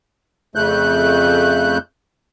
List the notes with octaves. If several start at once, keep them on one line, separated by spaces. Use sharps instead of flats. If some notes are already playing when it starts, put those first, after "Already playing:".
F2 C#3 A3 F#6 G6